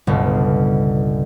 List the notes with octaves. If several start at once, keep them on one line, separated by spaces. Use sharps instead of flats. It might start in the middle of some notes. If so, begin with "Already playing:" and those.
G1 C#2 B2